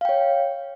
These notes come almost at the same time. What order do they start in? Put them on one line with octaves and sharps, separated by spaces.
F5 G5 C#5